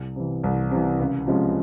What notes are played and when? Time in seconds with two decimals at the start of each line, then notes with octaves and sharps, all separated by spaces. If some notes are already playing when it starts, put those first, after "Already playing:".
Already playing: C2
0.16 C3 E3
0.44 C2
0.71 C3 E3
0.99 C#2
1.27 C3 F3 G#3 C#4